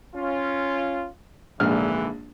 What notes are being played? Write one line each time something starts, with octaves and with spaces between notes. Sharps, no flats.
C#4 F4
A#1 G#2 D3 E3 F6